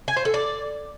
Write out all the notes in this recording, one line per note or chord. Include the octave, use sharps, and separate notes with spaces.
G#5
C5
A4
D5